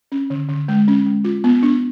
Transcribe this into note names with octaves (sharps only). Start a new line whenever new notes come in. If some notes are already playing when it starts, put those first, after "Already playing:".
C#4
D3
D3
G#3
C#4
G#3
F4
B3
D4